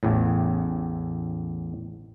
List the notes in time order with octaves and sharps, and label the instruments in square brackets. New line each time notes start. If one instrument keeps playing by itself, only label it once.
[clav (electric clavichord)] A1 E2 A2